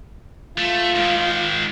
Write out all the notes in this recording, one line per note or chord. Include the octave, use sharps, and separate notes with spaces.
A3 F4
G#2 D#3